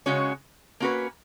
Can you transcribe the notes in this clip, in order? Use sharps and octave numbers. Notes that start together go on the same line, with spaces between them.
C#3 G#3 C#4 F#4 C#5
A#3 C#4 F#4 B4